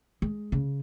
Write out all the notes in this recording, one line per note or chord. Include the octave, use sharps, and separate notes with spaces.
G#3
C#3